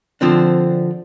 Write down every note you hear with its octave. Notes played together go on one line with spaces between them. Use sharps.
D3 F3 C4 D4